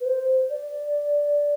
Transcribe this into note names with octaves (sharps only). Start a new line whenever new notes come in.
B4
C5
D5